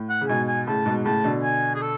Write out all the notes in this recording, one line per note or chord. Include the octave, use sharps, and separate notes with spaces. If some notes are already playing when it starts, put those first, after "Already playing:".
Already playing: A2
F#5
C#3
G#2 B2 G#5
G#5
A2 C#3 A5
G#2 B2
A2 C#3 A5
B2 D3
G#5
G#4
A4